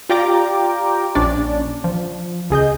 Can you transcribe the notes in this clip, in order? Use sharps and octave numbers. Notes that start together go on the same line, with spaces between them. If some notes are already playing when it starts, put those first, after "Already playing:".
F4 G4 D5 G5 A#5 D6
A#1 C#4 D4 D5
F3
C#2 G#4 D#5 G6